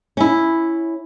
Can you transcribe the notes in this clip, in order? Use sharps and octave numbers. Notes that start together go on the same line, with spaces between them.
C#4 E4